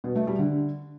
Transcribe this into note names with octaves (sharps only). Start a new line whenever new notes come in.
B2
A3
G3
D3